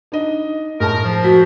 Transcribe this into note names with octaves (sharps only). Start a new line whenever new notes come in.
D4 D#4 D#5
A2 G#3 A#4 A5
F3
F#4 B6